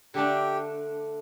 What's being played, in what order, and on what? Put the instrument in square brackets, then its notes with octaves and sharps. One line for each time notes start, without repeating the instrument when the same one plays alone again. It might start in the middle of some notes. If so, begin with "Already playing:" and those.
[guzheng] D3 A3 D4 [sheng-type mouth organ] G4